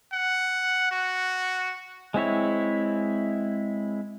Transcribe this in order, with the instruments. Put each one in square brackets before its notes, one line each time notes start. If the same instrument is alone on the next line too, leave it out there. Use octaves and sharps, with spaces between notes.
[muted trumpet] F#5
F#4
[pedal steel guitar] G#3 C4 E4 C#5